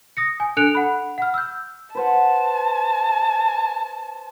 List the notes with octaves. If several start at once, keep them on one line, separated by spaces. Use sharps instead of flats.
D#6 A#6 C#7
G#5
D4 A4 F#6 C#7 D7 F7
F#5 B5
F#5 F6
E6 G6
B4 C5 F#5 A5